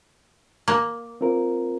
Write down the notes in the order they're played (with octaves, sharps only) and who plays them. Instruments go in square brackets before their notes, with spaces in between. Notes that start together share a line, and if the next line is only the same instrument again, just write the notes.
[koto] A#3
[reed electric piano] C4 F4 A#4